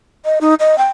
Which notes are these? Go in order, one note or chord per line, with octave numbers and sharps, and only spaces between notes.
D#5
D#4
D#5
G5